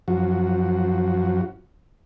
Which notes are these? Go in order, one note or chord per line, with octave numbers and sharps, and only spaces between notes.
F#2 F3 F#4